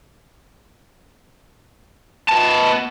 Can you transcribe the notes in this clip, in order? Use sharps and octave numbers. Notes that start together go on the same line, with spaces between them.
B3 A5